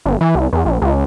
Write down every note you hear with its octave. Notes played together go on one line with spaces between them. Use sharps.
G1
E3
C2
E2
A#1
C#2